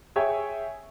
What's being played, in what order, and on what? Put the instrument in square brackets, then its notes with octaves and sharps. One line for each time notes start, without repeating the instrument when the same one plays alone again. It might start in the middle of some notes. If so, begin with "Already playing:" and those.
[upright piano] G#4 C#5 E5 G5 G#5 C#6